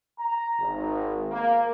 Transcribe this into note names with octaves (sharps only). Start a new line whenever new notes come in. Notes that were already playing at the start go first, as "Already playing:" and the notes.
A#5
G#1
A#3